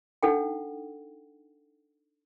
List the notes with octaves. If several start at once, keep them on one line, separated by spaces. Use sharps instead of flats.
D4 D#4 A4 F#5 G5